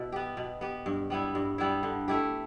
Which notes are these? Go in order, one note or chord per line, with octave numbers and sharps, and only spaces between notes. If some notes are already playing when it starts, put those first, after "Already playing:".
Already playing: B2 E4
B3 G4
B2
B3 G4
G2
G3 B3 E4
G2
G3 B3 E4
D3
A3 E4 G4